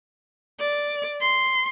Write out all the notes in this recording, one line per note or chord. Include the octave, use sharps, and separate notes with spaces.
D5
C6